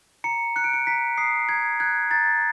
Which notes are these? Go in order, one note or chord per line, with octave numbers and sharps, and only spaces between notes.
A#5 C#7
F#6 C#7
D7
C#7
A#5 B6
D#6 C7
A#5 G#6
F#6 G#6
A#5 A6